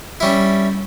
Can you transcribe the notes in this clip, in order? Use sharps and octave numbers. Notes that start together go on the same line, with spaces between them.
G3 C#4 E4